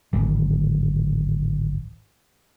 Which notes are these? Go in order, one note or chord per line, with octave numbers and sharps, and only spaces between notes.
D1 G#1